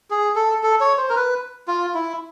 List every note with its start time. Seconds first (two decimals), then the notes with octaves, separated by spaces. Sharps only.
0.10 G#4
0.36 A4
0.63 A4
0.80 C#5
0.98 C5
1.10 A#4
1.16 B4
1.68 F4
1.95 E4